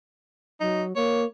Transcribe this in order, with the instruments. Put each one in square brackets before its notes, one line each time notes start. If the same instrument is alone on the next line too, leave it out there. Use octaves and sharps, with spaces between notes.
[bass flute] F#3 [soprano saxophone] D#4
[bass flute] A#3 [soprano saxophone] C#5